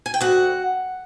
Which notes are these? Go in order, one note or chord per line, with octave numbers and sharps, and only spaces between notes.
G#5
G5
D2 F#4 F#5